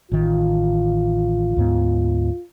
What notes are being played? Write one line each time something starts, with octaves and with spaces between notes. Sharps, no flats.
A1 D#3 F4
D2 G#2 B3